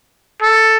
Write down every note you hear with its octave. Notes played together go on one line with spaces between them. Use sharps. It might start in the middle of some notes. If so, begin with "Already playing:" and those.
A4